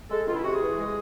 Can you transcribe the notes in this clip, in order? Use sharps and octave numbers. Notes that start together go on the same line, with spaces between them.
G#3 A4
C#2 F4
E4
C3 F#4
G#4
E3
G#3